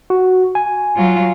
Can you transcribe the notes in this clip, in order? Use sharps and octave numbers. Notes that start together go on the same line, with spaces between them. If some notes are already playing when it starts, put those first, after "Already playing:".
F#4
G#5
F#3 F4